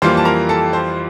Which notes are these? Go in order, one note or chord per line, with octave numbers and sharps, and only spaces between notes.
F2 E3 G3 A#3 F4 C5 C6
A5
A#4 A#5
A4 A5
C5